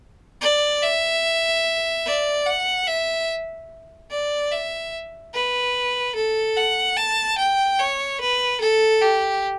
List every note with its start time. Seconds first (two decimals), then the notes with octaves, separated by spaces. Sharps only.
0.41 D5
0.83 E5
2.06 D5
2.46 F#5
2.88 E5
4.11 D5
4.52 E5
5.34 B4
6.15 A4
6.57 F#5
6.97 A5
7.38 G5
7.79 C#5
8.21 B4
8.61 A4
9.02 G4